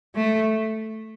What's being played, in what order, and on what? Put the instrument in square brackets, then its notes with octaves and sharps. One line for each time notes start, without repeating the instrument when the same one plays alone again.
[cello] A3